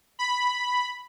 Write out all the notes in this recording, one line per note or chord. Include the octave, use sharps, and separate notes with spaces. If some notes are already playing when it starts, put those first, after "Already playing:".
B5